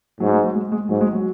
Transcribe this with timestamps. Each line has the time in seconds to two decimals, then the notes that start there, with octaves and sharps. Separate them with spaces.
0.20 G#2 F#3
0.33 G#3
0.43 F#3
0.55 G#3
0.72 G#3
0.89 G#2 F#3
1.01 G#3
1.13 F#3